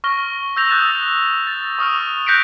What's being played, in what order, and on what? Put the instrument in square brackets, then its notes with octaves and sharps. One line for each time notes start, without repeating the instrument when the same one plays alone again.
[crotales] C#6 F6 A#6 G7
E6 G6 A#6 F7
D#6 E6 F#6 A6 E7
A6
C#6 D#6 F6 F7
F#6 G6 A#6 B6 C#7 D7